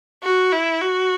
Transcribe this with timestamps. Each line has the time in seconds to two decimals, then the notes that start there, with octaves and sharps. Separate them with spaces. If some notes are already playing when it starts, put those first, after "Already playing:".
0.24 F#4
0.52 E4
0.81 F#4